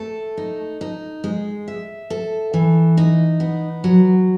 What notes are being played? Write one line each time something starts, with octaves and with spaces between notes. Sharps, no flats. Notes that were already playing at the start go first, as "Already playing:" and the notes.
Already playing: A3 A4
D#4
D#4
G#3
E5
A4
E3
D#4
B3
F#3